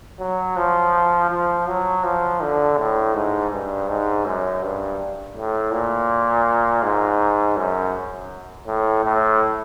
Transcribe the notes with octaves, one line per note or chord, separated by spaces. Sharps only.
F#3
F3
F3
F#3
F3
D3
A2
G#2
G2
G#2
F#2
G2
A2
A#2
G#2
F#2
A2
A2